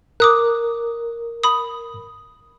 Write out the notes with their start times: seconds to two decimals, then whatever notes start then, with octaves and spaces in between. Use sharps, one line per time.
0.20 A#4 D6 D#6 F#6
1.44 B5 D#6